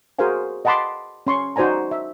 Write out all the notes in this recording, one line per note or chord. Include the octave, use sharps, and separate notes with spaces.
F#4 G#4 A#4 C5 F5 G#5
D#5 F#5 A5 B5 C6 D6
C#4 C6 C#6
D#4 F#4 C5 D5 G#5 A#5
E5